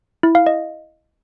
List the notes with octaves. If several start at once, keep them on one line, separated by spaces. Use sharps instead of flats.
E4
F5
D#5